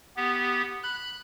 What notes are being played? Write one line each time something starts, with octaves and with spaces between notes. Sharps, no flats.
B3 G4
B5 F#6